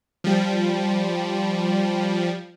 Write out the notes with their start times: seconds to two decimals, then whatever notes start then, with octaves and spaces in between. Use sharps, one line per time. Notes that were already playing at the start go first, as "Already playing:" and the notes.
0.24 F3 G3